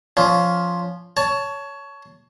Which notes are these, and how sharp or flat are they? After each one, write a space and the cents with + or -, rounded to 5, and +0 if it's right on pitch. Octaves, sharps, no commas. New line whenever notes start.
F3 +5 C#4 +15
C#5 +15 A5 +0